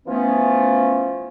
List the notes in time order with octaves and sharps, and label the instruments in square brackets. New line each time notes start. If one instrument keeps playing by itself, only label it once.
[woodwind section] E3 F3 A3 B3 C#4